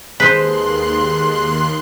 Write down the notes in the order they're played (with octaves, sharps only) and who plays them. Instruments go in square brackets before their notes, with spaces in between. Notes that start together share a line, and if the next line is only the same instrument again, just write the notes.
[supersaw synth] D#2 C6 F#6 [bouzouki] G#3 A5 [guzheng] B4 C5